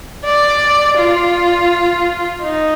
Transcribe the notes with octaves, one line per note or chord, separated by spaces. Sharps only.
D5
F4
D#4